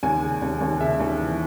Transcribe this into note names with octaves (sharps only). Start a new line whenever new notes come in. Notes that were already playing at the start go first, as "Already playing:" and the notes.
D#2 G#5
C#3
D#2
D#2
C#3 E5
D#2
E3